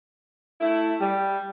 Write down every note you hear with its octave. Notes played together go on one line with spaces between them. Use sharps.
A3 E4
G3